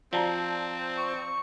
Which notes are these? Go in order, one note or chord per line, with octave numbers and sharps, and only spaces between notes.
F3 C4 D5 A5 A#5
C#6